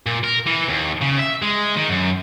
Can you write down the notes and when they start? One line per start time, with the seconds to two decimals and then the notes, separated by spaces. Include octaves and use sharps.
0.07 A#2
0.24 A#4
0.47 E3
0.69 D#2
1.01 C#3
1.19 E5
1.42 G#3
1.77 D#3
1.89 F#2